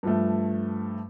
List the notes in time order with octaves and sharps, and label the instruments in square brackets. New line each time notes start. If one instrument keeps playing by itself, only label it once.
[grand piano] G2 F3 A3